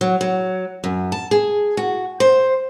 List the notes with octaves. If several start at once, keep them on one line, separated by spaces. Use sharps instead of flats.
F#3
F#3
F#2
A5
G#4
F#4
C5